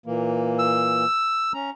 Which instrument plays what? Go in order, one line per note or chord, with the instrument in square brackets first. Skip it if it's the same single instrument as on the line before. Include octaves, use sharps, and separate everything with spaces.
[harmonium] A#2 E3 A#3
[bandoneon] E6
[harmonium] C#4 A#5